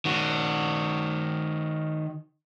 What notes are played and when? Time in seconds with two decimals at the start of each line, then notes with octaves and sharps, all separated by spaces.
0.05 D#3 F#4